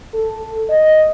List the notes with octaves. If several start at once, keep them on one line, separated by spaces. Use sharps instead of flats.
A4
D#5